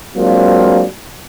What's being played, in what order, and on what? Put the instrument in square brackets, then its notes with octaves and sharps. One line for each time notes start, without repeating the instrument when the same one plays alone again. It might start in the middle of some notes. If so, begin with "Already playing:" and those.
[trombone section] F#3 G#3 A#3 C4 D4 F4